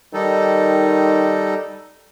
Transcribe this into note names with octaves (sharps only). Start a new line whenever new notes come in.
D#3 G3 D#4 A4